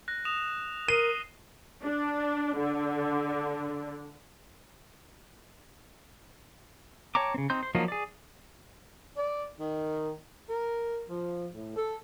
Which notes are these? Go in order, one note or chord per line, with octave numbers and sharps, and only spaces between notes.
F#6 A#6
D#6 E7 F7
A#4 D#6 C7 D#7 G7
D4
D3
C#5 G5 A5 A#5 D6
C#3 C4
C4 D#4 C6 G6
C5
F3 F#3 A#3 D#4 F4
G#4 D5
D5
D#3
A#4
F3
A2
A4